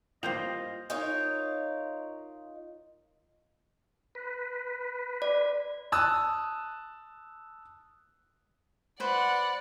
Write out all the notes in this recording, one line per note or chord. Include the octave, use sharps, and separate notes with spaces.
G3 A#3 F4 C5 D#5 G6 F7
D#4 F4 A#4 C#5
B4
D5
A5 D#6 E6 F#6
B4 C5 D5 F#5